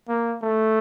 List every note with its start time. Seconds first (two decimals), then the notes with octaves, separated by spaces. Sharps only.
0.08 A#3
0.42 A3